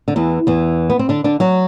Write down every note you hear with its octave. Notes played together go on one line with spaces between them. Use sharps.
D3
E2 E3
E2 E3
B3
C4
D3 D4
D3 D4
F#3 F#4